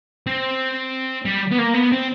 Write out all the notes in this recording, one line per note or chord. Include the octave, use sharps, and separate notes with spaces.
C4
G3
B3
A#3
B3
C4